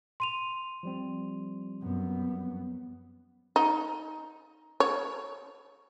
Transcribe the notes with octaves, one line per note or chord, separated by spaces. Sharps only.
C6 D#7 F7
F3 G3 C4
F#2 B3
D#4
C#5